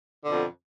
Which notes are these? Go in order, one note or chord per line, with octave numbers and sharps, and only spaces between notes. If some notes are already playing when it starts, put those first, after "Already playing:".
F2 B2 D3